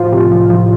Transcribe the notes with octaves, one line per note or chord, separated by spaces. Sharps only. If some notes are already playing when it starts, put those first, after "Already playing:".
Already playing: A2 F3 F4
C3
F3
F3